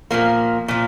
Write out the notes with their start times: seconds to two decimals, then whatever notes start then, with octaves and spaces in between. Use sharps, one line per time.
0.11 A#2 F3 A#3
0.68 A#2 F3